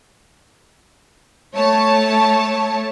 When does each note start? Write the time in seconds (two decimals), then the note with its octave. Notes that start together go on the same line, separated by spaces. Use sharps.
1.55 A3 C#5 A5